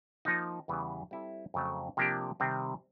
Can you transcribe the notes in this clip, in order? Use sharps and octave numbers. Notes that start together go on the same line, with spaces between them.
F3 A#3 D#4
E2 C#3 E3 G3 B3
G3 C4 E4 A4
F2 C#3 F#3 A3
C3 F3 A#3 D4 G4
C3 D#3 G3 C4